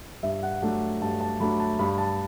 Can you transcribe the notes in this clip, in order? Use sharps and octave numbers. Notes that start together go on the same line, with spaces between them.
G2 E5
F#5
F#3 A3 D4 F#5
G2 A5
A5
F#3 A3 D4 B5
A5
G2 B5
A5